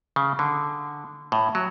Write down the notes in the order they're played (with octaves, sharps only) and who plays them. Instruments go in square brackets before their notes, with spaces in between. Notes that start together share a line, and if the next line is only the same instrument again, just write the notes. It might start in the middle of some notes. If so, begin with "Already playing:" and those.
[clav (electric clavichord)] C#3
D3
A2
F#3